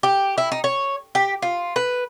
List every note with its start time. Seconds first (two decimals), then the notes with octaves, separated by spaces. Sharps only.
0.03 G4
0.38 E4
0.52 D#4
0.64 C#5
1.15 G4
1.42 F4
1.76 B4